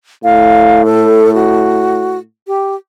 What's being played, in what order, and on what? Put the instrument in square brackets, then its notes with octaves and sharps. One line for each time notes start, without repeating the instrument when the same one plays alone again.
[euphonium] A2 [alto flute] F5
[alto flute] A4
F#4
G4